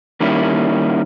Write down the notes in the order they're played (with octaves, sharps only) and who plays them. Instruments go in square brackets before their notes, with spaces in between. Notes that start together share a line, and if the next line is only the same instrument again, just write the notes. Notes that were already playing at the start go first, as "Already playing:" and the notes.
[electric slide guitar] D#3 G3 A#3 C#4 E4